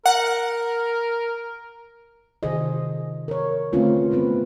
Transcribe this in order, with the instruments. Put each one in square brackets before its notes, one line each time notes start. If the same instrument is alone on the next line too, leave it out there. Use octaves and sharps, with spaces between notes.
[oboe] A#4 [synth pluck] F#5
[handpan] C3 D#3 G#4 C5 D#5
A#4 C#5
D3 A3 C4 C#4 F4 B4
G3 G#3 B3 C4 B4